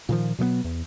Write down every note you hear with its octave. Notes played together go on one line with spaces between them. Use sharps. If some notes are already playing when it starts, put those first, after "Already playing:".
A#2 D#3 F3
B2 F#3 G#3 B3
E2